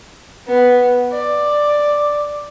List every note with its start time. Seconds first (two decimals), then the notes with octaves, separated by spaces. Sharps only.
0.47 B3
1.12 D5